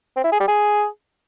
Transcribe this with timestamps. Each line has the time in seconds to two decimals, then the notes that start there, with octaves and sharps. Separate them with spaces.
0.16 C4
0.24 E4
0.32 G#4
0.40 G3
0.48 G#4